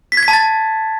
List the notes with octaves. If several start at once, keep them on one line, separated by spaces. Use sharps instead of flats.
B6
G#6
B6
A5
A6